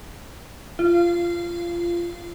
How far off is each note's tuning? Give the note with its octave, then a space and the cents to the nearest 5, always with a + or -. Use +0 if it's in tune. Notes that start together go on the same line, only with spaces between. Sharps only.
F4 -20